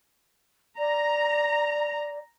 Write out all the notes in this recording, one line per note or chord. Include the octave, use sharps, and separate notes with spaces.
D5 A#5